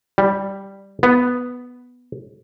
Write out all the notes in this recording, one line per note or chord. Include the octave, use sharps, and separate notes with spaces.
G3
B3